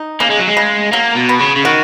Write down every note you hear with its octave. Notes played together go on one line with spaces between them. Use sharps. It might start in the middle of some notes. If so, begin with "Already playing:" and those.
Already playing: D#4
C#3 A#3
G#3
F#3
G#3
C#3
F#3 A#3
B2
B3
C#3
C#3
D#3 F#4